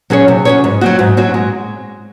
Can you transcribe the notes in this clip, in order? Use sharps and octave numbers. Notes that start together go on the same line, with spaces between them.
F#3 C#4 G#4 C#5
C3
F#3 C#4 G#4 C#5
G#2
F#3 C4 F#4
G#2
F#3 C4 F#4
G#3